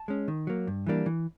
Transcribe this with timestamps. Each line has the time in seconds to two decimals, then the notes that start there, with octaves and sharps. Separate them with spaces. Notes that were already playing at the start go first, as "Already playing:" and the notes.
Already playing: A5
0.08 G#3 C#4
0.28 D#3
0.47 F#3 A#3
0.67 G2
0.87 E3 G3 A#3 D4
1.06 E3